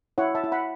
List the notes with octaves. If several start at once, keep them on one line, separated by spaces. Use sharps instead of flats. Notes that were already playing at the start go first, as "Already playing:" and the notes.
E4 C#5 F#5
E5 A5
E4
F#5 B5